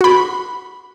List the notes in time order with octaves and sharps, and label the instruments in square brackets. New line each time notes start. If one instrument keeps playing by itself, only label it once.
[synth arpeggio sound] F#4 B5